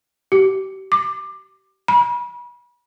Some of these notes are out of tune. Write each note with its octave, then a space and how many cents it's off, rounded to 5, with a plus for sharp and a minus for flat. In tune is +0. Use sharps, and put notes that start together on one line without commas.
G4 -35
D6 +20
B5 -35